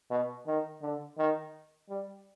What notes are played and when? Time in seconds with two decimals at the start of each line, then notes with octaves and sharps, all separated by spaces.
0.11 B2
0.47 D#3
0.82 D3
1.18 D#3
1.89 G3